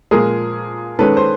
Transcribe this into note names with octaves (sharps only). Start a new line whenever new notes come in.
A#2 F3 G#3 G#4 A#4
D#3 G#3 C#4 A4 B4
C5